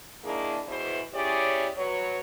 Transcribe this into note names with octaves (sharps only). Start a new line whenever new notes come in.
D#3 A#3 D4 E4 G#4
E2 B2 E3 E4 G#4 C5
C#4 E4 G4 G#4 C#5 D5
F#3 B4 C#5